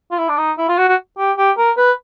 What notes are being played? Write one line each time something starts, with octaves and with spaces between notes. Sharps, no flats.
F4
E4
D4
D#4
E4
F4
F#4
F#4
G4
G4
A#4
B4